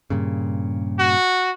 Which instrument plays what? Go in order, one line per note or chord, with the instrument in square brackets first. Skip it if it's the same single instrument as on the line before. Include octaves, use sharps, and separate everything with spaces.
[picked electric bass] G2 A#2 C#3
[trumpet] F#4